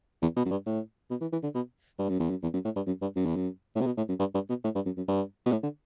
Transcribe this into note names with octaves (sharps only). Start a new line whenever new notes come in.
E2
B2
F#2
G2
A2
B2
E3
E3
D3
B2
G2
F#2
E2
F#2
E2
F#2
A2
G2
F#2
G2
F#2
E2
F#2
A2
C3
B2
A2
F#2
G2
G2
B2
A2
G2
F#2
F#2
G2
B2
A2
D3